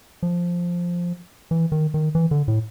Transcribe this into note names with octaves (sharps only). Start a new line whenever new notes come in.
F3
E3
D#3
D#3
E3
D3
A2